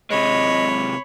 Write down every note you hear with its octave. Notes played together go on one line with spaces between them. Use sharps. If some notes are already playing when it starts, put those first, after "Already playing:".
C3 G#3 C#5 D#5 B5